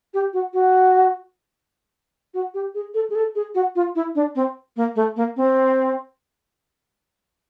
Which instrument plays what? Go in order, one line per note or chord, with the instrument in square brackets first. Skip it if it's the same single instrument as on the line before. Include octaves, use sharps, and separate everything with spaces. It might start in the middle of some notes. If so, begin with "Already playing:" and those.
[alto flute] G4
F#4
F#4
F#4
G4
G#4
A4
G#4
A4
G#4
F#4
F4
E4
D4
C4
A#3
A3
A#3
C4